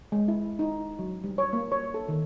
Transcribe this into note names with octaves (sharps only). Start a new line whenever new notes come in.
G#3
E4
D#4
F#3
G3
C#5
A#3
C#5
A4
D#3